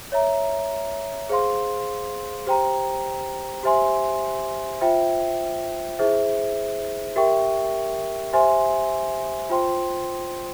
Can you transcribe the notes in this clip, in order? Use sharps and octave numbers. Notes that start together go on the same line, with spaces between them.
C#5 E5 A#5
G#4 C5 F5 C6
G4 C5 G5 A#5
G4 C5 E5 G#5 C6
F4 C5 E5 G5
E4 G#4 C5 E5
G4 A#4 E5 G5 C#6
G4 C5 E5 G#5 C6
F4 C5 G5 C6